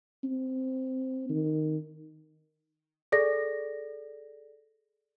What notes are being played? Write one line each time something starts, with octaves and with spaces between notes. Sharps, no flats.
C4
D#3
G#4 A4 D5 A#6